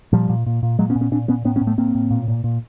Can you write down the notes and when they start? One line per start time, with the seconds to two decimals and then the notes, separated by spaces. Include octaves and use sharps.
0.13 A#2 F3 G3
0.29 A#2
0.46 A#2
0.63 A#2
0.79 A#2 F#3 G#3
0.90 B3 C#4
0.96 A#2
1.01 B3 C#4
1.12 A#2 C4 D4
1.28 A#2 B3 C#4
1.45 A2 B3 C#4
1.56 B3 C#4
1.61 A2
1.67 A3 B3
1.78 A2 A#3 C4
1.95 A2
2.11 A#2
2.28 A#2
2.44 A#2